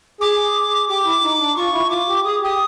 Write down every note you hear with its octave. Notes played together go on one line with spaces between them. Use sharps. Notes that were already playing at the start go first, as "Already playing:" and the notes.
G#4 D6
G#4
G#4
G4 D6
E4
D#4
D4
F4 C#6
E4
F4 D6
G4
G#4 D#6
G4 D#6